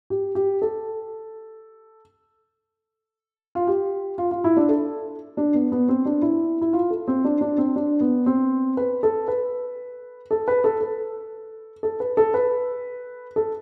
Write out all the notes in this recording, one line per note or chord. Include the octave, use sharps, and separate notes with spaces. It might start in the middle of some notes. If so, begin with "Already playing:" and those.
G4
G4
A4
F4
G4
F4
F4
E4
D4
A4
D4
B3
B3
C4
D4
E4
E4
F4
A4
C4
D4
D4
C4
D4
B3
C4
B4
A4
B4
A4
B4
A4
A4
A4
B4
A4
B4
A4